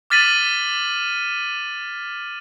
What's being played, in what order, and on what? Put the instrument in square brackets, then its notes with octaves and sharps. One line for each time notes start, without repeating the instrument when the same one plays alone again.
[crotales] D6 F6 A6 B6 D#7 F#7